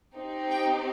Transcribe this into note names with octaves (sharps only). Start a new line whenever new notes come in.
C4 D#4 G4
G5